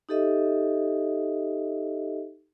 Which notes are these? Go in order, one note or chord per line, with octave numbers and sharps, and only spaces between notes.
D#4 G4 A4 D#5 E5